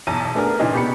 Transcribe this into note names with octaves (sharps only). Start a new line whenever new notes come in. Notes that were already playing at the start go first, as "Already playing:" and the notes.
B1 E2 A5 A#5 D#7
A3 B3 D4 G#4 A#4
A#2 C#3 E3 D4 D#4
B2 G4 B5 C#7